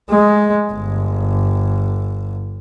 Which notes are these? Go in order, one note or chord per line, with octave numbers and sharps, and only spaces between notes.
G#3
G1